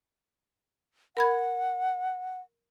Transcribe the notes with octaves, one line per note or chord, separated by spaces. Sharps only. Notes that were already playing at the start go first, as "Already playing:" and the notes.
A#4 F#5 B5 G#6